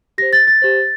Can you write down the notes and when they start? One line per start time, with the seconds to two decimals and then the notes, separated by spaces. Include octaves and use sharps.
0.18 G4 C5 A#6
0.33 A6
0.47 A6
0.62 G4 C5